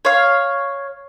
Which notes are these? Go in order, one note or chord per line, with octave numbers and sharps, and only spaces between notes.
C#5 F5